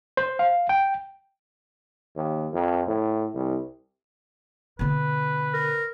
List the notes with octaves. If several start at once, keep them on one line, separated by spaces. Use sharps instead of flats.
C5
F5
G5
D#2
F2
A2
C2
B2 D3 B4
A#4